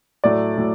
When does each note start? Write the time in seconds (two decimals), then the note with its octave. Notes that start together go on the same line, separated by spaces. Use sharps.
0.24 A2 F#3 A3 D5
0.58 A2 F#3